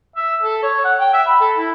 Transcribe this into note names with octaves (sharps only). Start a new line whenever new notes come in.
E5
A4
C#5
F#5
G5
E5
B5
A4
E4